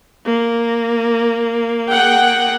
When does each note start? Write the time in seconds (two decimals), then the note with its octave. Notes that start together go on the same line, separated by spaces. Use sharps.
0.25 A#3
1.89 G#4 F#5 G5